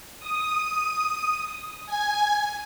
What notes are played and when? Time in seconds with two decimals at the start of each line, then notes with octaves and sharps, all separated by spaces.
0.19 D#6
1.86 G#5